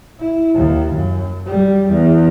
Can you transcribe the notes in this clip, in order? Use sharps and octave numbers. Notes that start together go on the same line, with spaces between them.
E4
D#2
F#2
G3
E2